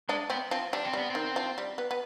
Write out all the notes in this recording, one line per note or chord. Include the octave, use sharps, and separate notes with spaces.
G#3 D4
B3 C4
F3 C4
G3 D4
C4
G3 B3
D#3 C4
F3
G3
B3
B3